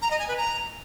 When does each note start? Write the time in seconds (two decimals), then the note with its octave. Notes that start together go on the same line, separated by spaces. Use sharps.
0.02 A#5
0.11 D#5
0.19 G#5
0.28 B4
0.37 A#5